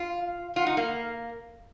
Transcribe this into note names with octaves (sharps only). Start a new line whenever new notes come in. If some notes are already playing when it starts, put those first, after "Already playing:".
Already playing: F4
F5
F5
F4 F#5
D#4
A#3
F5